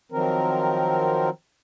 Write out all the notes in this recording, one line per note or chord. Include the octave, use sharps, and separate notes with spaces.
D#3 F3 F#3 C4 A#4